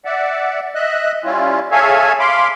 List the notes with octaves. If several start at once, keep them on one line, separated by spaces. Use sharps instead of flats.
D5 E5 F#5
D#5 E5 F#6
G3 C#4 E4 F4
G#4 A4 C#5 E5 F5 G#5
F5 B5 C6 D6